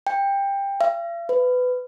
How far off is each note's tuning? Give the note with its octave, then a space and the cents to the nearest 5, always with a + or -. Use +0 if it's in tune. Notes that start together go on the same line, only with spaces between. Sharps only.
G5 +20
F5 -45
B4 +20